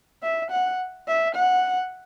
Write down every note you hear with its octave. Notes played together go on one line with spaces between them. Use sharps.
E5
F#5
E5
F#5